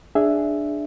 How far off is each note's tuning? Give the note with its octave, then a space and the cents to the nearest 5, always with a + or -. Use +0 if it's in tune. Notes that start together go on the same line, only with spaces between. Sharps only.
D4 +10 G#4 +0 E5 +0